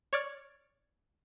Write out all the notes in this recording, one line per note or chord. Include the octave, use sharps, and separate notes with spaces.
C#5 D5 F6